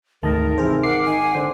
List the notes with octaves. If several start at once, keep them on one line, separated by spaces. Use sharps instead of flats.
G#1 D2 A3 A#4 A5 D#6 A#6
C3 E3 G#4 C5
A#4 F#5 D6 C7
D#3 G#5
F#5
D3 C5